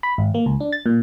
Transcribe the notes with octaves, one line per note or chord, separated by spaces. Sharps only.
B5
G#1
A#3
C#2
D4
A6
A#2